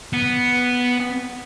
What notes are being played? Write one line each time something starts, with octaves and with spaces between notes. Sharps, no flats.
B3